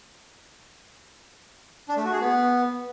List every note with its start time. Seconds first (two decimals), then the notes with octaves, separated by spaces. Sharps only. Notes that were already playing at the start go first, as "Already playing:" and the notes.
1.89 D4
1.97 A3
2.05 F#4
2.13 G#4
2.21 B3